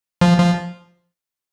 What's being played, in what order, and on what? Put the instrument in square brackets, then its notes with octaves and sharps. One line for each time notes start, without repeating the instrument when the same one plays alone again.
[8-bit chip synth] F3
F3